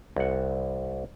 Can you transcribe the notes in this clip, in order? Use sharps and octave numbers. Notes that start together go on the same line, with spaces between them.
C2 F#5